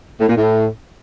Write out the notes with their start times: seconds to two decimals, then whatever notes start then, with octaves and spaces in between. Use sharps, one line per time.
0.19 A2
0.28 A#2
0.36 A2